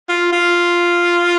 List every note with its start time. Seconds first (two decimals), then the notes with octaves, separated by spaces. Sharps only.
0.09 F4
0.33 F4